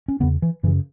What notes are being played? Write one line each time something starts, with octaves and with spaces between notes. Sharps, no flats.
C#4
E2 C#3 B3
E3
F#2 C#3 E3